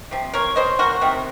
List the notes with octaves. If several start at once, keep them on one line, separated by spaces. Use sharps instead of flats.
C3 F3
A#4 C#5
C5 D#5
F#4 A#4
C3 D#3